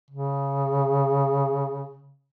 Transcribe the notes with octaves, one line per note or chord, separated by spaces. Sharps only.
C#3